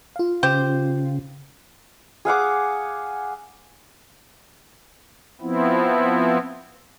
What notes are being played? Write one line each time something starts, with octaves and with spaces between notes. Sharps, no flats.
F4 F5
C#3 G4 C5
G#4 F5 F#5 D6
F3 B3 C4 E4